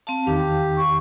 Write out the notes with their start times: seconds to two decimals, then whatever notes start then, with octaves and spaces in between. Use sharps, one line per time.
0.07 C4 F5 A5
0.27 E2 D#3 G4 F5 G5
0.77 C#6